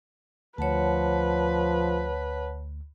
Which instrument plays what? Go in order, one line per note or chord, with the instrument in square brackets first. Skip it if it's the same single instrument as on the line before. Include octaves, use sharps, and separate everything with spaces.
[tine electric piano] D2 [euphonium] F3 [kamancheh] B4 [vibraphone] C#5 F#5 A5